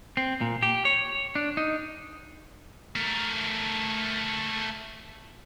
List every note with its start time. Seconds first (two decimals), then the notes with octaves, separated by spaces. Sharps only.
0.17 C4
0.41 A#2
0.63 G4
0.85 C#5
1.35 D4
1.57 D#4
2.96 A3 A#4